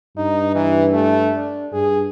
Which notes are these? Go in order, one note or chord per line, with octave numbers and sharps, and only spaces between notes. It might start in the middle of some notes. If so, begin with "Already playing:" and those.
G2 D#4
E3
A3
D4
G2 G#4